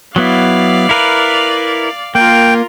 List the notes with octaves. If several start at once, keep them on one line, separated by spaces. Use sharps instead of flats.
F#3 B3 E4 D5 F5
E4 A#4 B4
A#3 F4 A#4 G5